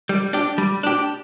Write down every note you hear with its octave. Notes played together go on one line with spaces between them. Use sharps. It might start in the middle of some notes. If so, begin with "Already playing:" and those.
G3
D4 G4
G3
D4 G4